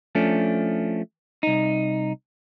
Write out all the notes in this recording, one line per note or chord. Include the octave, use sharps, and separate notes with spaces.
F3 A3 C#4 D4
C2 D#4